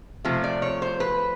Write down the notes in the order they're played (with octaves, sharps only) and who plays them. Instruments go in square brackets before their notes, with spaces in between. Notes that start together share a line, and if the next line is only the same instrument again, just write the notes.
[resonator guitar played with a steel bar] C3 F3 A3
D5
C#5
C5
B4